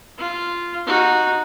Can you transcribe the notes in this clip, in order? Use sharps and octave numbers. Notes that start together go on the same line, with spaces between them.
F4
D#4 F#4